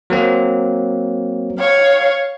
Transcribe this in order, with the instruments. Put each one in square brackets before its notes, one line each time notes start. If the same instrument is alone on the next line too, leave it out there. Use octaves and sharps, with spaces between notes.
[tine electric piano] F#3 A#3 C4
[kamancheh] C#5 F5